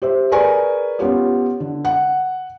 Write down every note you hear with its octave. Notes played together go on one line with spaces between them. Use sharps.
G4 C5 E5
G#4 A#4 B4 D5 G#5 C#6
B3 C#4 F4 G4 C#5
D3
F#5